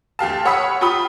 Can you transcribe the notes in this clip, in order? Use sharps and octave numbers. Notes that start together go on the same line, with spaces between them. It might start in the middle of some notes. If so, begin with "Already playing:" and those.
D2 G4 F5 A5
C#5 F#5 B5 D#6 E6 B6
F4 G4 G5 B5 D#6